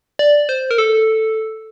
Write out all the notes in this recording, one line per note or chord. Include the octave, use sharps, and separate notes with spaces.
D5
C5
A#4
A4